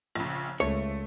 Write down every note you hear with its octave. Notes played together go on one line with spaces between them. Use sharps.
A#1 C#3
C#2 A3 C#5